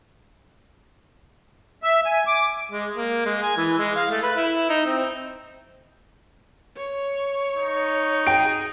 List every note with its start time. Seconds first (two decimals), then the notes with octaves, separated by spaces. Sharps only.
1.83 E5
2.05 G#5
2.27 D6
2.72 G#3
2.97 A#3
3.26 G#3
3.42 G#5
3.57 E3
3.78 G#3
3.96 F5
4.10 A3
4.23 B4
4.36 E4
4.69 D#4
4.86 C4
6.76 C#5
7.57 D#4
8.27 G#4 G5 D7